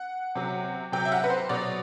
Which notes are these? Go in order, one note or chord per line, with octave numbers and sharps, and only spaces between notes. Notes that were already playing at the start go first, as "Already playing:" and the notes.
Already playing: F#5
C3 F#3
C3 F#3 G5
E5
F#5
B4
C5
B2 F#3 D5